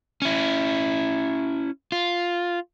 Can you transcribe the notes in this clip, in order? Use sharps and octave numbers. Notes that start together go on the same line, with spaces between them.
C#4 E4
F4